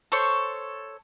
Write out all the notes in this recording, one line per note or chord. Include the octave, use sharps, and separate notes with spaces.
A4 C5 C#5 C#6